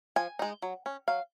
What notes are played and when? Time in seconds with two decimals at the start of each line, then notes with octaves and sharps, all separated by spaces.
0.16 F3 G#5
0.39 G#3 D#4
0.62 F#3
0.86 C#4
1.08 F#3 F5